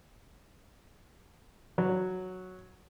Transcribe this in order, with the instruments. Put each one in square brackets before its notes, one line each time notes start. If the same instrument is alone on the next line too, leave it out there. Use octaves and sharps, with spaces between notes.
[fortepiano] F#3